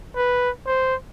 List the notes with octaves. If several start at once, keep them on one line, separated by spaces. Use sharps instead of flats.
B4
C5